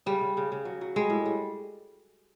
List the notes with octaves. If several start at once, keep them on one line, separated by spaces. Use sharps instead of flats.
C#3 G3
C#3
C#3
C#3
F#3
F#3
G3 G#3
A2
G3